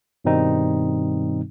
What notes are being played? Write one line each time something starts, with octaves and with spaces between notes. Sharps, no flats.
G2 B2 D#3 G3 C4 D#4